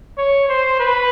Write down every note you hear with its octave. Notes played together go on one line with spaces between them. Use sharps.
C#5
C5
B4